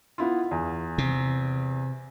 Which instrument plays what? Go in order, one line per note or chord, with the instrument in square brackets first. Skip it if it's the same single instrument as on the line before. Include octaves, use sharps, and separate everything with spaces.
[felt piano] B3 E4 F4
E2
[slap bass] C3